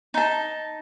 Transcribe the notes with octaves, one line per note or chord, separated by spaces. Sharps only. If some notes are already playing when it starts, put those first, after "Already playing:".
D#4 A5